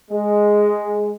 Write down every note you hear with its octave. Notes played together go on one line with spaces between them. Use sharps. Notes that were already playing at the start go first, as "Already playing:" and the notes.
G#3